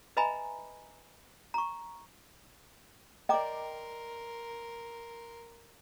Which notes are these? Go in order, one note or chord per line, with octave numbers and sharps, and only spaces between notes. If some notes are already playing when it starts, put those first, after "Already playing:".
B4 D#5 E5 G#5 A#5 B5
A#5 C#6
A#4 D5 D#5 G5 A#5 C6 D6